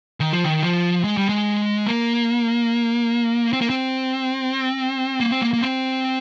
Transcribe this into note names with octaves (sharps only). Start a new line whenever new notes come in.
D#3
F3
D#3
F3
G#3
G3
G#3
A#3
C4
A#3
C4
A#3
C4
A#3
A#3
C4